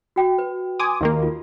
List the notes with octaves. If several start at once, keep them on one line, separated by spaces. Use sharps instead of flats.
F#4 G5
B4
G#5 C6 D6 D#6
D#2 D#3 A#3
F4